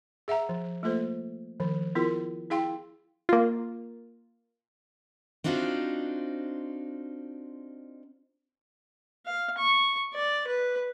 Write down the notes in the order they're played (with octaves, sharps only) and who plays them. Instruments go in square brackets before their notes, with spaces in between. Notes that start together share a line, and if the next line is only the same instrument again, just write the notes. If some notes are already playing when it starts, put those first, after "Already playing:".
[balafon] G#4 E5 F#5 A#5
F3
A3 A#3 F4 A4 C5
D#3 F3
B3 E4 F4 G#4 A#4
E4 G#4 F5 G5 C6
[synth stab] A#3 F4
[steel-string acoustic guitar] C4 D4 D#4 F4 F#4 C5
[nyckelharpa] F5
C#6
D5
B4